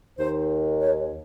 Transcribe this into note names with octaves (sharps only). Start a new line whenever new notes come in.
D#2 D#3 C5
C#5